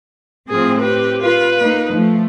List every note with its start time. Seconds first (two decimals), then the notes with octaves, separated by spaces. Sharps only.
0.49 A2 F3 C4 G#4
0.80 G4 B4
1.22 F4 B4
1.59 A#3 D#4
1.95 F3 A3